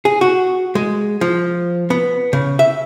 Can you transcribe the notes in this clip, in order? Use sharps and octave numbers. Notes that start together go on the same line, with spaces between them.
G#4
F#4
G#3
F3
B3
C#3
E5